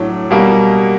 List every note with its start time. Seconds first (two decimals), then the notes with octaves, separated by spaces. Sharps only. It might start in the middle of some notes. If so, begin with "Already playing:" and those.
Already playing: A2 F#3 A3 D4
0.31 B2 G3 A#3